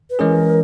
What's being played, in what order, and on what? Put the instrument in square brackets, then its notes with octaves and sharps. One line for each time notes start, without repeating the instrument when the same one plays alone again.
[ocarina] B4
[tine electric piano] E3 G#3 C#4 G#4 [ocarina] A#4